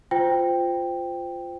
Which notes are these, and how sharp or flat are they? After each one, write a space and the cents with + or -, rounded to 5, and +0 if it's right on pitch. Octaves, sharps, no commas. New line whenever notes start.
F4 +0 C5 -20 G5 +5